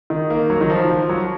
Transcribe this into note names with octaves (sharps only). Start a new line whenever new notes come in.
D#3
A#3
F#3
D#3
F3
F3
F#3